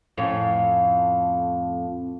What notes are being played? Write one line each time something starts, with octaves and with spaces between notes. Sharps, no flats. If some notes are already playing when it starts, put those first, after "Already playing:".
F2 A2 C#4